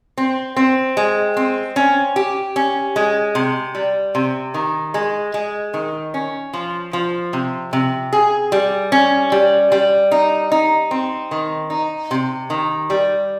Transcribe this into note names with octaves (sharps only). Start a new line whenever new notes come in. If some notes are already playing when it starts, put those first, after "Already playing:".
C4
C4
G#3
C4
C#4
G4
C#4
G#3
C3
G3
C3
D#3
G#3
G#3
D#3
C#4
F3
F3
C3
C3
G#4
G3
C#4
G3
G3
D#4
D#4
C4
D#3
D#4
C3
D#3
G3